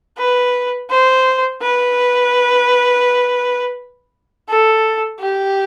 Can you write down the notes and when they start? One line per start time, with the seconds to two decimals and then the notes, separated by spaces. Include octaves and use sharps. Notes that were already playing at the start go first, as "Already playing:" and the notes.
0.18 B4
0.90 C5
1.61 B4
4.49 A4
5.20 G4